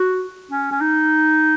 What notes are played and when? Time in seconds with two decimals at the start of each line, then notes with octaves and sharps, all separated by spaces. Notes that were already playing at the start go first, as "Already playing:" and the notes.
Already playing: F#4
0.51 C#4
0.72 C#4
0.81 D#4